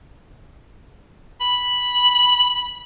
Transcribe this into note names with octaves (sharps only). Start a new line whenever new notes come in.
B5